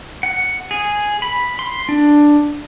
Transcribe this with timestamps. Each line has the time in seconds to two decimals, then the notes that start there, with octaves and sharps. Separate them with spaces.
0.23 F#5
0.71 G#4
1.22 B5
1.59 C6
1.89 D4